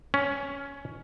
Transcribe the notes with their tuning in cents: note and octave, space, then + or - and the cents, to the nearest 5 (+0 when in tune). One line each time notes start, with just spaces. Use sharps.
C#4 +10